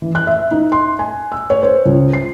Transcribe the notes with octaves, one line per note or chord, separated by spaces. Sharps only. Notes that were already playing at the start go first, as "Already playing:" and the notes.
E3
F#6
E5
D#4
C6
G#5
E6
C#5
C5
C#2
C7